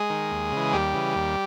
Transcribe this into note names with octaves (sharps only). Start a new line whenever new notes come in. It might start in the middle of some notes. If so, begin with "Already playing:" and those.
Already playing: G#3 G#4
D#3
D#2
C#3 E3
D#2 G3 G4
C#3 E3
D#2